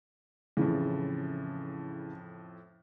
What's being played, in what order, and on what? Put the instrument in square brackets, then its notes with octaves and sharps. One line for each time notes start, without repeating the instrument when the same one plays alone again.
[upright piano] F2 A2 [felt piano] C#3 E3